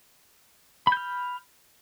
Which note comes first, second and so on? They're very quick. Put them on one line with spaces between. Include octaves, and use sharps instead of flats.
B5 G6 F6